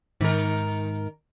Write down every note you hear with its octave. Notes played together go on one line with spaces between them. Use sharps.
G#2 D#3 A#4